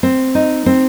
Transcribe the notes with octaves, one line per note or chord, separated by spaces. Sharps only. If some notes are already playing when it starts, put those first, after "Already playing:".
C4
D#4
C4